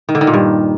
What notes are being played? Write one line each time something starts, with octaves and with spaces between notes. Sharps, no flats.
D#3
D3
D#3
A#2
G2